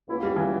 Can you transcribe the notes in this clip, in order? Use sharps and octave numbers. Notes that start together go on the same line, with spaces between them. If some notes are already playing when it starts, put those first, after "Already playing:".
C#2 B2 A#3 E4
G3
E3